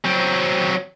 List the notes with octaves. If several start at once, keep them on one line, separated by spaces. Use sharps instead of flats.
F#3 C4